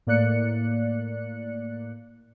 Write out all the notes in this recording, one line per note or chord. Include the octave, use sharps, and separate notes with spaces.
A2 A#3 D5 F#6 C#7